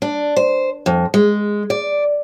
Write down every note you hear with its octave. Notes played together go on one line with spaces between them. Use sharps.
D4
C5
F2
G#3
D5